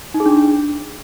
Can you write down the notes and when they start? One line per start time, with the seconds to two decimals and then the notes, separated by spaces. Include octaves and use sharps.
0.14 D#4
0.20 G#4
0.26 D4